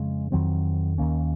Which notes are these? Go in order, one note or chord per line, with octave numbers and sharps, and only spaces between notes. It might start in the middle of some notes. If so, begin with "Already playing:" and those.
Already playing: F2 C#3 G#3
F2 D#3 F#3 C4
D#2 D#3 A#3 C#4